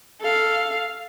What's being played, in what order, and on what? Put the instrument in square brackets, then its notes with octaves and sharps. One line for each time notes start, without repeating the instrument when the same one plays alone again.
[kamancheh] A4 F5